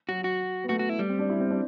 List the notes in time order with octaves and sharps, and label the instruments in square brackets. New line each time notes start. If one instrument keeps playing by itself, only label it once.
[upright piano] F#3 [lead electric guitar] F#4
[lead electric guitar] F#4
[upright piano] B3
[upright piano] A3 [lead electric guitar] F#4
[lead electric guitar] F#4
E4
G3
[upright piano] C4
D4
E4
C4
D4